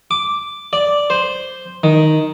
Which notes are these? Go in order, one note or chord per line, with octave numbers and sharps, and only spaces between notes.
D6
D5
C5
D#3